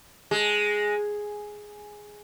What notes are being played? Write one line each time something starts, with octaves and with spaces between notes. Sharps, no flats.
G#3